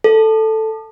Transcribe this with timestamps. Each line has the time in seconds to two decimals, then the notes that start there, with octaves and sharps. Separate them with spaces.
0.04 A4